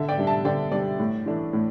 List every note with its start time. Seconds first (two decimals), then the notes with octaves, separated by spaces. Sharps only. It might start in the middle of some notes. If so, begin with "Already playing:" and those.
Already playing: D3 E5 A5
0.09 D5 G5
0.18 G3 D4
0.27 E5 A5
0.45 D3 D5 G5
0.72 G3 D4 D5
0.99 A2
1.26 E3 A3 D4
1.53 A2